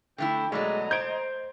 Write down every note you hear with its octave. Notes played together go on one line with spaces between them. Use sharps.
D3 A3 E4 G5
B2 F#3 G#3 A3 D5 D#5 A#5
C5 G6 G#6 D7